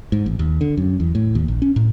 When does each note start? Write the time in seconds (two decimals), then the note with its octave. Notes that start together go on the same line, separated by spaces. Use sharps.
0.12 G#2
0.26 A1
0.39 D#2
0.61 D3
0.77 F#2
1.00 E2
1.15 A2
1.35 D#2
1.48 A#1
1.62 C#4
1.76 A2